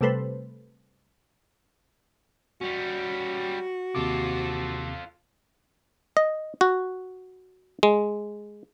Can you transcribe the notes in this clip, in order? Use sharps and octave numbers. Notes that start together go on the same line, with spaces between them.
C3 G3 A3 A4 B4 C5
G3 C#4 F#4
D#2 C3 F4 A4 D6
D#5
F#4
G#3